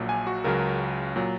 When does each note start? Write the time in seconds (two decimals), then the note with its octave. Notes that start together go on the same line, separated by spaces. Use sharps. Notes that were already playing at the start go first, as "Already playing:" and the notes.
Already playing: A#1 A#2 F#3
0.09 G#5
0.27 F#4
0.44 C#2 C#3 F#3 A#4
1.16 A#2 F#3